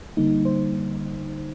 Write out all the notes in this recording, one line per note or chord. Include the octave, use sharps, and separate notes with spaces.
D3 G3 A#3 D#4
C5